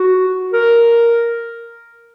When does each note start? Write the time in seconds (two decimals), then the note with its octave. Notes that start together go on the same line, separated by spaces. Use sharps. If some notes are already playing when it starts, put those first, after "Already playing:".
Already playing: F#4
0.53 A#4